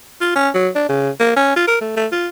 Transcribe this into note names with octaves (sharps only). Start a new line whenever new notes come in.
F4
C#4
F#3
D4
C#3
A#3
C#4
F4
A#4
A3
A3
F4